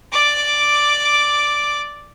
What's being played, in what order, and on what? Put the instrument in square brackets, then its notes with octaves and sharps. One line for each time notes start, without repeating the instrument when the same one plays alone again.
[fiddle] D5 D6